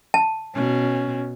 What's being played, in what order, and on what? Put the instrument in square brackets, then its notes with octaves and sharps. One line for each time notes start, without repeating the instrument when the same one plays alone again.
[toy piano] A5
[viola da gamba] B2 [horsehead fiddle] C#4